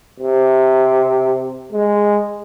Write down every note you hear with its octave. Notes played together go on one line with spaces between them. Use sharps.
C3
G#3